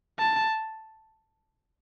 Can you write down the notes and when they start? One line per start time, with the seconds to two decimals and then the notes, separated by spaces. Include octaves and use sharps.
0.19 A5